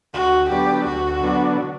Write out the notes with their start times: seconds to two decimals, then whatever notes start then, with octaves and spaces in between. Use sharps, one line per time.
0.13 D2 F#4
0.49 D3 F#3 B3 D4 G4
0.85 D2 F#4
1.21 D3 F#3 B3 D4